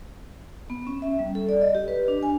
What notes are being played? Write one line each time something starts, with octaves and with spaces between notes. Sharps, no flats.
B3
C#4
E5
G3
A4
D5
D#5
G4
B4
D4
G#5